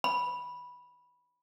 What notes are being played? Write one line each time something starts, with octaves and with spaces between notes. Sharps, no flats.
B5